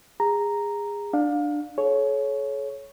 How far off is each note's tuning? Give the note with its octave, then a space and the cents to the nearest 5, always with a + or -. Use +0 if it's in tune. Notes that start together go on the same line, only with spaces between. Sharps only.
G#4 -25 A#5 -5
D4 +15 F5 +25
A4 -45 C#5 +0